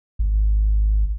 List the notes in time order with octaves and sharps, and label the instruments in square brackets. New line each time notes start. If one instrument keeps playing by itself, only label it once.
[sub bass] G#1